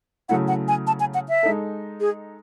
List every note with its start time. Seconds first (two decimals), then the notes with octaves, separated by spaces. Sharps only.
0.29 C#3 F#3 A3 E4 F#5
0.48 F#5
0.68 G#5
0.87 A5
1.00 G#5
1.14 F#5
1.29 E5
1.43 G#3 D#4 A4
2.00 G#4